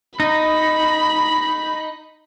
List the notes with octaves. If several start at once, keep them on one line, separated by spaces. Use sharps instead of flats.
D#4 B5